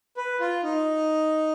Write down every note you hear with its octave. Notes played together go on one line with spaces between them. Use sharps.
B4
F4
D#4